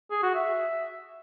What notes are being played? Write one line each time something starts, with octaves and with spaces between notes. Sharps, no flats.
G#4
F#4
E5